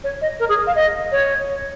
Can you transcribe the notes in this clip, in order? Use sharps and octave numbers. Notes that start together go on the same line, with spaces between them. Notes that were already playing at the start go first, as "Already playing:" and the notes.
C#5
D#5
A#4
G#4
F5
D#5
C#5